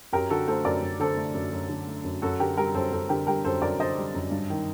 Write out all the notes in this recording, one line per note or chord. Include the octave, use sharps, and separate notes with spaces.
F#2 G4 A#4
D3 F#4 A4
A3 A4 C5
F#2 A#4 D5
F#2
D3 A4 C5
A3
F#2
F#2
D3
A3
F#2
F#2 F#4 A4
D3 G4 A#4
G3 G4 A#4
F#2 A4 C5
F#2 A4 C5
D3 G4 A#4
G3 G4 A#4
F#2 A4 C5
F#2 A#4 D5
D3 C5 D#5
G3
F#2
G2
D#3